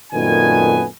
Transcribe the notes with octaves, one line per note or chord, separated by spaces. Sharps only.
F#2 A#2 D#3 A3 B3 G#5